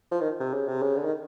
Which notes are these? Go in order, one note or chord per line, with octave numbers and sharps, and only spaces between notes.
F3
D#3
C3
C#3
C3
C#3
D3
D#3